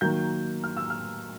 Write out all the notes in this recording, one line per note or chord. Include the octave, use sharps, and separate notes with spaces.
D#3 F#3 A#3 G6
F6
E6
F6